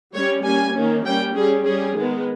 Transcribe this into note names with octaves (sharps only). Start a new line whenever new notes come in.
G3 C#4 C#5
G3 A#3 C#4 G#5
D#3 A#3 C#4
G3 A#3 C#4 G5
G3 C#4 G#4
G3 C#4 G#4
D#3 G#3 B3